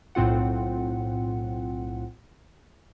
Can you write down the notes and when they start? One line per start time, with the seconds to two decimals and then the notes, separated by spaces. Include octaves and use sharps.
0.15 B1 A2 C4 F4 F#5